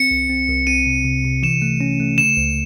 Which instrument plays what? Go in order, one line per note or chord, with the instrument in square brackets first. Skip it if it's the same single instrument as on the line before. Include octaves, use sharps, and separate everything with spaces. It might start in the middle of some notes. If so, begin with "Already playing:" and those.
Already playing: [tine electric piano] C4 [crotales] C#7
[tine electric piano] C2
C4
C2
[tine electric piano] C4 [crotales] D#7
[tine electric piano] C3
C3
C3
[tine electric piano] E3 [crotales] E7
[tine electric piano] A3
C#4
A3
[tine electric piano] C#3 [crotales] E7
[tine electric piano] C#2